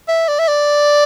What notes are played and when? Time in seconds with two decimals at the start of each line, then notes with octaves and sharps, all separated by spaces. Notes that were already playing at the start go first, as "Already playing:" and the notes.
0.08 E5
0.28 D5
0.39 E5
0.48 D5